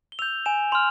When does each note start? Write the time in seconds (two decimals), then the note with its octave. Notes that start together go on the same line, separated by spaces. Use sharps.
0.12 G7
0.19 E6 G6 F7
0.46 G#5 E7
0.72 C6 F6 F7